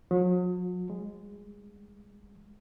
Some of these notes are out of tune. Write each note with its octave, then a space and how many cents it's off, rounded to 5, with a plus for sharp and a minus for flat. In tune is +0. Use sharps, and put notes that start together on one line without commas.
F#3 -45
G#3 -15